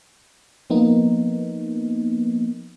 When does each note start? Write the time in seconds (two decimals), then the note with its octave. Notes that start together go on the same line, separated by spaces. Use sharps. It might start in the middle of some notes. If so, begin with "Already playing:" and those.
0.70 F3 A#3 B3 D#4